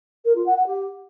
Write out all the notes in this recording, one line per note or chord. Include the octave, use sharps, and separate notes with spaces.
A#4
F4
F#5
F#5
G4